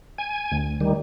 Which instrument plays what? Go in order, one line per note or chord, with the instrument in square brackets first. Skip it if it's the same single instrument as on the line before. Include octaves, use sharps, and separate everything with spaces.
[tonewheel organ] G#5
[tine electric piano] D2
[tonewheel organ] D#3 G3